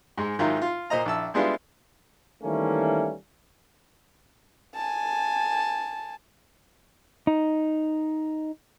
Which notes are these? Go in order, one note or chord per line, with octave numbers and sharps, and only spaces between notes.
G#2 G#3
G#2 D#3 F#3 E4 F4
F4
A#2 C5 D#5 A#5
A#1 E4 A5 E6
G3 G#3 B3 D4 E4 F4
D#3 E3 G3 A3 A#3 C#4
G#5 A5
D#4